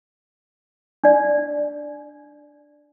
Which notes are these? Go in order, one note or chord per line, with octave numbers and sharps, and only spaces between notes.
D4 D5